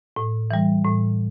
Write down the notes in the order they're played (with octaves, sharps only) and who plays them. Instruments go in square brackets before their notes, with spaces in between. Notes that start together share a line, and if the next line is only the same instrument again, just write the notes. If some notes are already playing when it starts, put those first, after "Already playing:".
[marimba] A2
E3 G3
A2